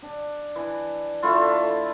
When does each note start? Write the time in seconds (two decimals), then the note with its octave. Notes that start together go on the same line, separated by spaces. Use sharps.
0.02 D4
0.56 E3
1.22 D3 A3 E4 F4